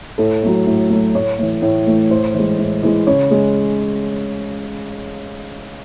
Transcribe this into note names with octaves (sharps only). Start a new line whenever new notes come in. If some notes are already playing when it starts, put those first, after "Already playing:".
A2 A4
F#3 A3
A2
F#3 A3
A2 C#5
E3 A3
A2
E3 A3
A2 C5
E3 G#3
A2
E3 G#3
C#3 C#5
G#3